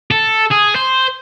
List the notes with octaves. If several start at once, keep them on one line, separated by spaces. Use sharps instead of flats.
A4
G#4
C5